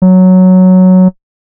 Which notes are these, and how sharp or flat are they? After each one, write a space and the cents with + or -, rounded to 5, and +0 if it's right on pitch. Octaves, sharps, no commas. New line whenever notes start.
F#3 +0